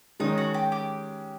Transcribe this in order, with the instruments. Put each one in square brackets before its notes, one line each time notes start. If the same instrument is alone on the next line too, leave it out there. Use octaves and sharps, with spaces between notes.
[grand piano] D#3 G#3 C#4 [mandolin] D#4
[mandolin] F#4
G4
G4